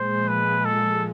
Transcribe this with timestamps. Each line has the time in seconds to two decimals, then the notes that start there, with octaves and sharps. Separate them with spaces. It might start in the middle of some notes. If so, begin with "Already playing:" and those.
Already playing: A#2 F3 G#3 C5
0.28 B4
0.65 A4